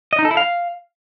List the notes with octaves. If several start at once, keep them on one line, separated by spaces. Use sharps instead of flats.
D#5
D#4
A4
E4
F5